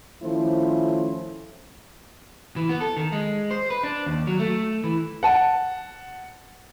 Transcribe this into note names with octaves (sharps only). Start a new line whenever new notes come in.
D#3 F3 A3 C#4 E4 C5
E3
B3
A4
D#3
G#3
C5
B4
D4
D#2
F#3
A3
E3
F#5 A5